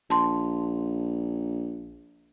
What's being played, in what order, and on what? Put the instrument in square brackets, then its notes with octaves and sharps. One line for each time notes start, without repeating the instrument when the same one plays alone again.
[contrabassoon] A#1 [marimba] A5 C6